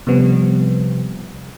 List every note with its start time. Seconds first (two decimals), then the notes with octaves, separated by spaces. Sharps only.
0.07 C3 F3 G3 B3 C4